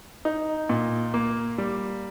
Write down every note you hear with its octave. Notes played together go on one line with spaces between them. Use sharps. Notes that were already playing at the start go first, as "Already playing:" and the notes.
D#4
A#2
A#3
G3